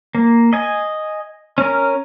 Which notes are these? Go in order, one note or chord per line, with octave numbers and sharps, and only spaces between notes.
A#3
D#5 G#5
C#4 A#4